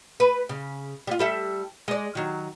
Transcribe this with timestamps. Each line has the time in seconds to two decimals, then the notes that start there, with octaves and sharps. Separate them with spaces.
0.20 B4
0.49 C#3
1.07 G3 F4
1.19 G3 A4 E5
1.88 G#3 D5
2.15 D#3 F#3